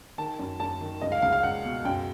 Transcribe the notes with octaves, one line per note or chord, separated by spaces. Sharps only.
D#3 A5
F#2
F#2 A5
D#3
C#2 D#5
F5
C#2 F5
F5
C#2 F#5
B2
F#2 G5